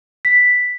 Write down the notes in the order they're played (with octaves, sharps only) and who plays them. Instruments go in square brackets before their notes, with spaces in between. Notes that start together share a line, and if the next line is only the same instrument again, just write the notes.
[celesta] B6